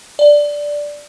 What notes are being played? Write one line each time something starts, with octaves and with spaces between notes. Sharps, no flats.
D5